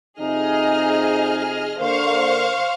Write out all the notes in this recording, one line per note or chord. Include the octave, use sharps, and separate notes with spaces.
F2 C3 D#4 G#4 D#5 F6
D3 A#3 C5 F5 C#6